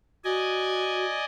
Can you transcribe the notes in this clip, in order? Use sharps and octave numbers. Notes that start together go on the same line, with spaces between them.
F#4 D5 D#5 G#5